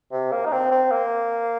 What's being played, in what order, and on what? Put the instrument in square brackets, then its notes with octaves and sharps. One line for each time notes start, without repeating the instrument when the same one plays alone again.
[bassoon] C3
A#3
D#4
C4
C4
A#3